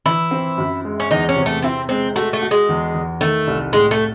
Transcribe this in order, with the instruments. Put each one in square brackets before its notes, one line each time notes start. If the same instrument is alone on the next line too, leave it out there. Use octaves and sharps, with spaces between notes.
[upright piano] E3 [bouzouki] E4
[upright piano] C4
F#2
G#3
[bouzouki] C#4
[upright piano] E2 [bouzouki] D#4
[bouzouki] C#4
[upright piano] C3
[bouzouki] A3
[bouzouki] C4 [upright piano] E4
[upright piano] G#3 [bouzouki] C4
[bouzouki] A3 [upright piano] F#4
[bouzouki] A3
[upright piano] F#4
[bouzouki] G#3
[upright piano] E2
E2
[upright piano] D#3 [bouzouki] A3
[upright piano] C2
[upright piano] A2 [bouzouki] G#3
[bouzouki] A3